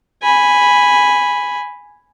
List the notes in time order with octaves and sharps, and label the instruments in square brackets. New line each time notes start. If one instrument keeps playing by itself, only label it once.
[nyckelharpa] G#5 B5